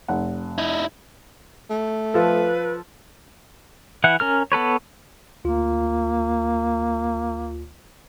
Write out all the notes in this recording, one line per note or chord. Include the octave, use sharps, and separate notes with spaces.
F1 F#5
D#4 E4
A3
F3 A4 B4
E3 E4 F#5
C#4 A#4 F6
B3 A4 B4 C#5
D2 A#3 F4